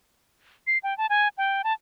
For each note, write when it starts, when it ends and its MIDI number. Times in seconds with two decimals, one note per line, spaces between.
0.67 0.78 96
0.83 0.96 79
0.98 1.06 81
1.10 1.28 80
1.38 1.62 79
1.64 1.73 81